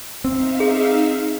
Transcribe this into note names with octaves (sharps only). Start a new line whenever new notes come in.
C4 D#4 E5 F5
G#4